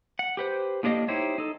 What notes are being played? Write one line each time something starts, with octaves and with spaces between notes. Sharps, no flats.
F#5
G4 B4 C5
A2 A#3 D4 G4 D#5 F5
D#4 E4 G4 C5 C#5
D#4 A4